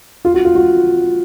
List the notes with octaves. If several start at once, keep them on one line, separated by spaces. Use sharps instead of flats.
F4
F#4
F4
F#4